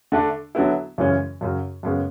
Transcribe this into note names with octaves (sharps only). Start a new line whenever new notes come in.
D3 A3 D4
D3 F#3 B3 E4
F#2 C#3 E3 G#3 C#4
F#2 C#3 F#3
F#2 C#3 G#3 B3